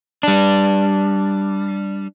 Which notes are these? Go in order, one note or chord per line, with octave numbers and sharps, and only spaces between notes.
G3 D4